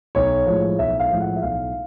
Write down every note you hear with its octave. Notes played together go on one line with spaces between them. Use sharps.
B1 C#5
A2 F3 G#3
B1 E5
F5
A2 F3 G#3
F#5
E5
B1 F5